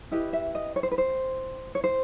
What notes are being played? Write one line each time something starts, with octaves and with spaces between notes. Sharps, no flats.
E4 G4 B4 D#5
E5
D#5
C#5
C5
B4
C5
C#5
C5